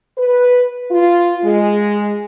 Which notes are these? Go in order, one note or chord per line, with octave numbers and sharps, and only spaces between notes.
B4
F4
G#3